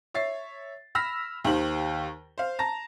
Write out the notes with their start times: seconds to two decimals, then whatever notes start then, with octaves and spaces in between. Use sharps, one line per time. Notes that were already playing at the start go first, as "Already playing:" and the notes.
0.14 C#5 E5 A6 C7
0.95 B5 E6 F6 A#6 B6
1.44 D#2 D#3 G4 C5 F#7
2.38 C5 F5
2.59 A5 A#5 A#6